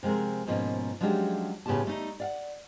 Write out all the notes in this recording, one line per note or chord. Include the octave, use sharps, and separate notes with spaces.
C3 F3 G#3 C4 A#4
G#2 B2 F3 A#3 C#4
F3 F#3 G#3 C#4 D4 G4
A2 C#3 B3 F4 G4 A5
G3 A3 D#4
D5 F5 F#5